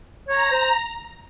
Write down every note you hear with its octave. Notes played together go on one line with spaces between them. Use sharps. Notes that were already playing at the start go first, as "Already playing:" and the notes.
C#5 A#5
C5